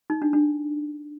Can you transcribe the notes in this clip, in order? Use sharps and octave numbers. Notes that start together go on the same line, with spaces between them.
D#4
D4
D4